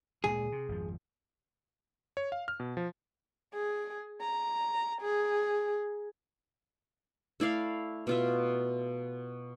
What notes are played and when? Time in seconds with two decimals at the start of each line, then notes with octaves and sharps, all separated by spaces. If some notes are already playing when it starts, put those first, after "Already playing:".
0.24 D2 A#2 G#3 G#4
0.52 C3
0.68 G#1 F2 F3
2.17 C#5
2.32 F5
2.48 F6
2.60 B2
2.77 F3
3.54 G#4
4.21 A#5
5.01 G#4
7.40 A3 E4 D5 F5
8.07 B2 F4 E5